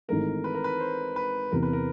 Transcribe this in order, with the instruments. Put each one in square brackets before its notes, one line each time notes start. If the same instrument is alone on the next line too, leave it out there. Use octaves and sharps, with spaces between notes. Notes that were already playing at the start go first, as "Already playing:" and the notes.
[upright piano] G#1 G#2 E3 A3 [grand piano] A#4
[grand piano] B4
A#4
B4
C5
B4
[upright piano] E2 C3 E3 [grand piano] A#4
[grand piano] B4
A#4